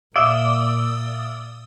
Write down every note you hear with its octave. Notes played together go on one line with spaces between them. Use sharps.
A#2 D5 E5 F5 D#6 E6 G7